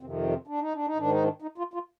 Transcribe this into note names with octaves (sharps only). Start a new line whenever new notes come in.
F2 C3 D#3 C4
C4
D4
D#4
D4
D#4
G#2 D#3 D4
D#4
D4
D#4
F4
F4